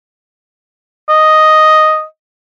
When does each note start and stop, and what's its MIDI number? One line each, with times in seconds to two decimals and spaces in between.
1.09 2.03 75